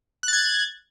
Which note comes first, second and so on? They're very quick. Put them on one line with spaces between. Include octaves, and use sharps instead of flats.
F#6 A6 G#6